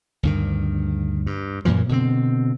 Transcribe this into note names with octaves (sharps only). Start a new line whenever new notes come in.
D2 G2 D#3
G2
F#2 A#2 E3 F3
B2 D3 E3 C4